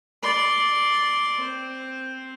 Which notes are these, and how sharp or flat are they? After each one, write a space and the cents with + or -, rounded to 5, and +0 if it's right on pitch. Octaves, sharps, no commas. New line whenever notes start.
D5 -5 C6 +0
C4 +0 C5 +0